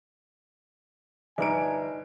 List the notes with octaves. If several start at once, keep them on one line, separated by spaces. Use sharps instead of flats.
G1 D#4 A#4 D5 G#5 D7